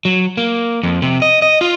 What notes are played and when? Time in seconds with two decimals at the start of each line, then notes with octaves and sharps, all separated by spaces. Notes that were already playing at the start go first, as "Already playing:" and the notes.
0.05 F#3
0.37 A#3
0.83 F2
1.02 C3
1.22 D#5
1.42 D#5
1.61 F4